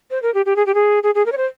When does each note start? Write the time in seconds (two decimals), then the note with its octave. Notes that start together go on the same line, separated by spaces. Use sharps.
0.11 C5
0.22 A#4
0.34 G4
0.46 G4
0.56 G#4
0.66 G4
0.74 G#4
1.03 G#4
1.15 G#4
1.26 A#4
1.32 C#5
1.37 C5